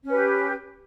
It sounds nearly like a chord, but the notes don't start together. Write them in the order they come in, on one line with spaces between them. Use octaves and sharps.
C#4 B4 G4